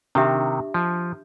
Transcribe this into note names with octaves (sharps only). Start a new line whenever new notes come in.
C3 D#3 D4 G4 E5
F3